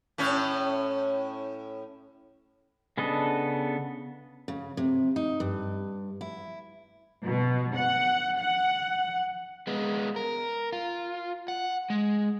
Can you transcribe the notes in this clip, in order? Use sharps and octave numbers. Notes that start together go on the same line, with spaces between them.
A2 C#4
C#3 B3 D4 A4 D#5
C#3
C3
D#4
G2
E4
B2
F#5
F#5
G#3 B3
A#4
F4
F#5
G#3